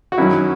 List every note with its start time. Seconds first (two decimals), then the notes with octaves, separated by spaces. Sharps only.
0.12 F#4
0.18 F#2 D#3 F#3 C#4 E4